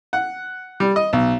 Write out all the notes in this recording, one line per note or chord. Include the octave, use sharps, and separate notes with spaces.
F#5
G3
D#5
B1